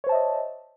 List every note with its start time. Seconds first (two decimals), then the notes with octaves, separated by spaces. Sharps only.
0.04 C#5
0.07 C5
0.09 A5
0.12 E5
0.15 D#5